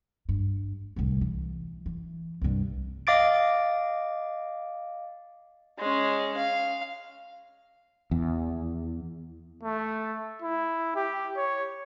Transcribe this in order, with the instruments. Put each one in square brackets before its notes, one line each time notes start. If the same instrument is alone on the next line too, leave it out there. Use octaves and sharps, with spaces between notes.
[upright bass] G2
D1 C2
E3
E3
C2 G2
[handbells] D#5 F5 D6 A6 D7
[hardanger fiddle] G#3 C#4
F5
[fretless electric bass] E2
[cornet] A3
E4
G4
C#5